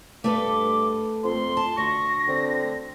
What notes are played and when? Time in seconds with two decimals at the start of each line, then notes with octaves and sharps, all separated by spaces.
0.24 G2 A3 A4 B4 D6
1.24 F2 C6
1.57 A5
1.77 D2 C#6 A#6
2.28 D3 C4